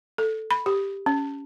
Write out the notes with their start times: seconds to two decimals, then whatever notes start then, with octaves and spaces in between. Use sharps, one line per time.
0.18 A4
0.51 B5
0.66 G4
1.06 C#4